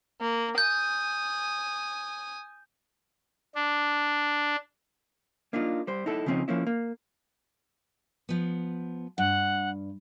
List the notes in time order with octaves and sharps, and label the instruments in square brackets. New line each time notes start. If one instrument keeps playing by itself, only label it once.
[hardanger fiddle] A#3
[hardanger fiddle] G#5 D#6 [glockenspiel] G6
[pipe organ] D4
[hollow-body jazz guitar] A#3 D4 D#4 F4
G3 C5
D#4 E4 A4
C#3 F3 C4 C#4 D#4
F3 A#3 C#4 E4
A#3
[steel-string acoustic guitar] F3 B3
[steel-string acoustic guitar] G2 [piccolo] F#5